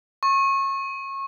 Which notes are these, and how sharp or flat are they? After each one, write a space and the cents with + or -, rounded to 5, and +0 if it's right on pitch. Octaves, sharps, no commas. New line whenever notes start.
C#6 -25